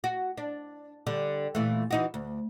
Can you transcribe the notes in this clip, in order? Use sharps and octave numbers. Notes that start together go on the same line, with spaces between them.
F#4
D4
D3 G3
A#2 E3 A3
E3 D#4 F#4
D2